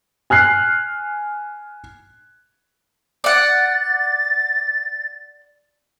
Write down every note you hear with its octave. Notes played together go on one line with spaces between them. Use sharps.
G#5 F6 F#6 C7
D5 F#5 A6